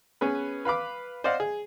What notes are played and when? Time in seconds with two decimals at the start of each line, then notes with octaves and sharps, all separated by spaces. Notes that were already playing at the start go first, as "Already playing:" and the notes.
0.21 B3 C#4 G#4 B4
0.65 B4 F5 B5 D6
1.24 C5 D5 D#5 F5 F#5
1.40 G#4